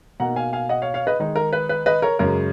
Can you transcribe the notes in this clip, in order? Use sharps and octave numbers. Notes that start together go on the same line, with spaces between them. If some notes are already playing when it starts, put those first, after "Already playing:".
B2 A#3 D#4 F#5 A#5
F5 G#5
F5 G#5
D#5 F#5
C#5 F5
C#5 F5
B4 D#5
D#3 G#3 D#4
A#4
B4
B4
B4 D#5
A#4 C#5
F#2 C#3 G#3 C#4 A#4